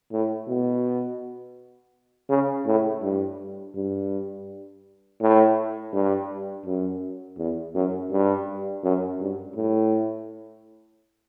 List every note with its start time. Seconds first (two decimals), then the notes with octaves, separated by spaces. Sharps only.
0.12 A2
0.48 B2
2.30 C#3
2.66 A2
3.03 G2
3.75 G2
5.21 A2
5.93 G2
6.66 F#2
7.38 E2
7.75 F#2
8.11 G2
8.84 F#2
9.20 G2
9.56 A2